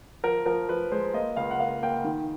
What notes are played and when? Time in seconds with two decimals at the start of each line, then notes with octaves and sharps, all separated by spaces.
0.23 F3 A#4
0.45 F3 A#4
0.69 F3 B4
0.92 G#3 C5
1.14 A#3 D#5
1.36 C#2 F5
1.51 F#5
1.59 A#3 F5
1.83 A#3 G5
2.04 D#3